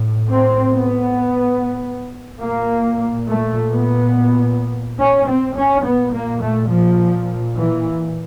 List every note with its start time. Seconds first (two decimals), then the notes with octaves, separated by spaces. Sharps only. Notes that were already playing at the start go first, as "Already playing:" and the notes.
Already playing: A2
0.30 C4
0.73 B3
2.43 A#2 A#3
3.29 A3
3.72 B3
5.00 C#4
5.28 C4
5.57 C#4
5.85 A#2 B3
6.13 A#3
6.42 A3
6.71 F3
7.56 E3